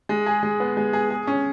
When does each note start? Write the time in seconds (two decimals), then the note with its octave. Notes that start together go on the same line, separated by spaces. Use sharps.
0.09 G#3
0.26 G#4
0.43 G#3
0.60 B3
0.77 G#3
0.93 G#4
1.10 G#4
1.27 C#4